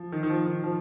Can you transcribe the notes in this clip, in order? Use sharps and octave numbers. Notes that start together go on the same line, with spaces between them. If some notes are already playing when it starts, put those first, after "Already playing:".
Already playing: F3
D#3
D#3
F3
D#3
F3